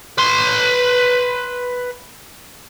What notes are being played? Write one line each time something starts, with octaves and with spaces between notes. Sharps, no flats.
B4 C6